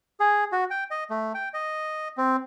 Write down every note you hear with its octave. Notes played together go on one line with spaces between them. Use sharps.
G#4
F#4
G5
D#5
A3
G5
D#5
C4